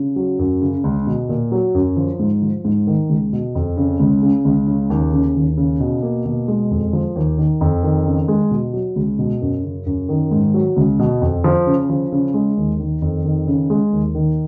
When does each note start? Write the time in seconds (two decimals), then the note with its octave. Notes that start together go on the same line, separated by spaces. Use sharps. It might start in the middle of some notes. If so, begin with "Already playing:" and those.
Already playing: C#3
0.16 F#3
0.39 F#2
0.62 C#3
0.84 C#2
1.07 B2
1.29 A#2
1.52 F#3
1.75 F#2
1.97 F3
2.19 G#2
2.42 F3
2.65 G#2
2.87 D#3
3.10 C#2
3.33 B2
3.55 F2
3.77 C#3
4.00 C#2
4.23 C#3
4.45 C#2
4.68 C#3
4.90 D#2
5.13 C#3
5.35 D#2
5.57 C#3
5.80 B2
6.03 A#3
6.25 B2
6.48 G#3
6.71 F2
6.93 F3
7.16 D#2
7.38 D#3
7.61 F2
7.83 D#3
8.06 C#3
8.28 G#3
8.51 B2
8.73 F#3
8.96 C#2
9.19 B2
9.42 F#2
9.64 C#3
9.86 F#2
10.09 D#3
10.31 G#2
10.54 F#3
10.76 C#2
10.99 B2
11.21 F2
11.44 F3
11.67 C#3
11.90 F3
12.12 C#3
12.34 G#3
12.57 D#2
12.79 D#3
13.02 F2
13.25 D#3
13.47 C#3
13.70 G#3
13.93 D#2
14.15 D#3